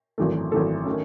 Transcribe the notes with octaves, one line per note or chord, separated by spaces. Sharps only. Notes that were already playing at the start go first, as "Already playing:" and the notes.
G#1 F#2 E3 A3
G#1 F#2 E3 A3 A4
D#3 A3 C#4